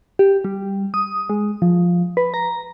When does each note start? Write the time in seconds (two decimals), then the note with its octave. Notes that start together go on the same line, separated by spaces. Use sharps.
0.19 G4
0.44 G3
0.94 D#6
1.29 G#3
1.62 F3
2.17 B4
2.34 A#5